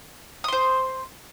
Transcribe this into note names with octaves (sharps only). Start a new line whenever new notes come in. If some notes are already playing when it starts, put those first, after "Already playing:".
C5 C6 D#6